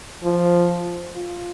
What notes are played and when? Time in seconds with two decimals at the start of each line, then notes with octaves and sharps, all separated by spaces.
0.24 F3
1.15 F4